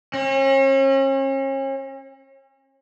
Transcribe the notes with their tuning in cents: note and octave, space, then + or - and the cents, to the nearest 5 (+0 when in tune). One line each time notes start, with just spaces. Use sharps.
C#4 -40